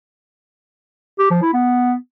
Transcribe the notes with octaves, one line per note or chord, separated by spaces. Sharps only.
G4
F3
E4
B3